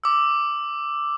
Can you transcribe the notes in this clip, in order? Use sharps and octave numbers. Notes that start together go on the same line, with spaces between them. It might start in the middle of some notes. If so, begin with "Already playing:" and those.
D6 E6